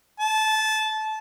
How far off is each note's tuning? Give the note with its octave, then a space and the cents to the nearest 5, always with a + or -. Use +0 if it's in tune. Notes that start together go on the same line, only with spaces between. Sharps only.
A5 -20